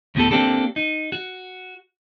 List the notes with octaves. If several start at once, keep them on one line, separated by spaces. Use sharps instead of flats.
D2 A2 B3 G4 A4
A#3 C4 D4 G4 A4
D#4
F#4